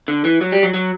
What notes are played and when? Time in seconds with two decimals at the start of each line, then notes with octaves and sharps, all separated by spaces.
0.08 D3
0.25 E3
0.41 F#3
0.52 G3
0.63 F#3
0.74 F#3